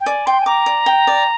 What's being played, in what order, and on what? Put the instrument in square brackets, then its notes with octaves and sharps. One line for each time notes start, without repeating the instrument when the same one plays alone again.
[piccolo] G5
[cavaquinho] D5 [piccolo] G#5
[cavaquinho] G5 [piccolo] C6
[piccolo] G#5
[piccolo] A#5 [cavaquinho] D6
[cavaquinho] D5
G5
D5